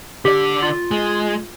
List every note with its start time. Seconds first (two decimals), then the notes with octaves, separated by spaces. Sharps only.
0.25 D3 G4 D5
0.63 F4
0.91 G#3